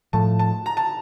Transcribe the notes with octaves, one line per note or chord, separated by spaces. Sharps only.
A2 F3 A3 A5
A5
A#5
A5